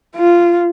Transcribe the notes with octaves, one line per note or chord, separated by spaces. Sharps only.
F4